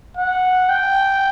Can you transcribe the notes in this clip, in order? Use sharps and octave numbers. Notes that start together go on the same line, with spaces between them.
F#5
G5